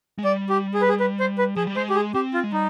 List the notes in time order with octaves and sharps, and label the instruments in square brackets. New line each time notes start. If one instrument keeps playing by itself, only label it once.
[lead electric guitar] G#3
[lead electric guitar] G3 [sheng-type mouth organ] D5
[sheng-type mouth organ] G4
G#4
B4
G#4
B4
C5
B4
[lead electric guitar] F3 [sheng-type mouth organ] G#4
[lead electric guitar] G3
[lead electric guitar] G#3 [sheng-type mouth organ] C5
[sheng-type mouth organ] G4
G#4
[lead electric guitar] C4 [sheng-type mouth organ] G4
[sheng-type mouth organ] F4
[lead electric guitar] G#3
[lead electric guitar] G3 [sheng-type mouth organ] D#4